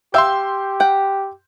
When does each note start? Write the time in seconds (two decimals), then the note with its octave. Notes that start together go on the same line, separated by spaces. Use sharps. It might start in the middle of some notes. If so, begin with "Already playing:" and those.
0.14 G4 E5 F5 G5 C6 E6 G6
0.80 F#5 G5